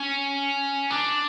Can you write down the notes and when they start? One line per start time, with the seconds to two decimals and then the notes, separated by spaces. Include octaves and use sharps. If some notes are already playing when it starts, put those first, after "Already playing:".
Already playing: C#4
0.90 D4